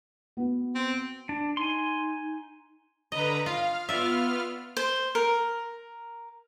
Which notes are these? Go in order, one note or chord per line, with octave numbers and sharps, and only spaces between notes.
B3 F#4
C4
D4
D#4 G#5 C6
D3 B4 D#5 A#5
F4 F5
B3 F4 D5 E5 F6
C5
A#4